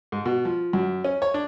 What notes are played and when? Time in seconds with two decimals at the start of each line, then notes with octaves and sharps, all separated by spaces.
0.12 G#2
0.25 B2
0.45 F3
0.73 F#2
1.05 C#4
1.22 C#5
1.34 D4